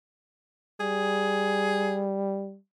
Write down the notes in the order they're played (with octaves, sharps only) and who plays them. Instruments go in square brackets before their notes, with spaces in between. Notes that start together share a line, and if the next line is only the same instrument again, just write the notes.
[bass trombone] G3 [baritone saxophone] G#4